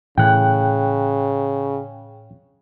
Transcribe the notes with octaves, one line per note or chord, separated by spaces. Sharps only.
A2 C#3 E3 G5 F#6